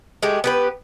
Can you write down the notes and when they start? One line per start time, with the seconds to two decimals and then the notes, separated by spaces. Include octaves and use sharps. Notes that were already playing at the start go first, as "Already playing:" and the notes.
0.22 G#3 A3 G4
0.44 B3 G4 B4